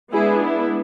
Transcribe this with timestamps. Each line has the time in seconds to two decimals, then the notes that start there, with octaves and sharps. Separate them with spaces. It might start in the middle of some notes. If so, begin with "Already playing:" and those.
0.13 G#3 B3 D4 E4 G#4
0.43 E4